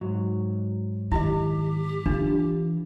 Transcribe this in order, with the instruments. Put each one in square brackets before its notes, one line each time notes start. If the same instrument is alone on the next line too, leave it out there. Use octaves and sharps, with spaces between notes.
[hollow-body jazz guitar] G#2 F#3
[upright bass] D#3 [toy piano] E4 D#5 [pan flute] G4
[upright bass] E3 [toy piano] D4 [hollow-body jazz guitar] F4